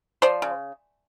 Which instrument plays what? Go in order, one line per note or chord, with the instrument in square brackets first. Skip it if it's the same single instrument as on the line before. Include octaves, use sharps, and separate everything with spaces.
[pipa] F3 C5 D5
C#3